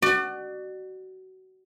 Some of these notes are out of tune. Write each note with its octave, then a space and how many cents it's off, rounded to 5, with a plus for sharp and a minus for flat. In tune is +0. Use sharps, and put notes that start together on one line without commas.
F#4 +25 D5 +35